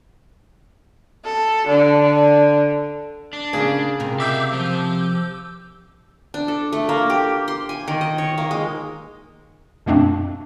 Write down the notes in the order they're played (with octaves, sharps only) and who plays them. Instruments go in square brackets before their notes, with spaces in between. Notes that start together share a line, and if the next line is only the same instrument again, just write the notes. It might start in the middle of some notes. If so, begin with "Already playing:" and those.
[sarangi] A4
D3
[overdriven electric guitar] D4
[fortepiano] C#3 G#4 [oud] A#3
[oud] C3 F4 A#4
[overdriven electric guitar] E5 F5 [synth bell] D6 E6 G6
[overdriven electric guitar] F3
[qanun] D4
A4
A3
A#3
G4
C6
G#5
D#3
D#5
C#5
A#3
G#3
[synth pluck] F#2 B2 A3 A#3 C4 D4